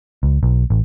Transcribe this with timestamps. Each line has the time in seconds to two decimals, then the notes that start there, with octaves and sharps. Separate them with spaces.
0.23 C#2
0.43 B1
0.70 A1